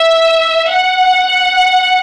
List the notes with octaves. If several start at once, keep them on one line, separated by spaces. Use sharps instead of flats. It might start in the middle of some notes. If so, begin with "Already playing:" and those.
Already playing: E5
F#5